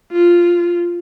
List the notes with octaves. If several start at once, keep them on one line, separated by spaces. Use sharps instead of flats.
F4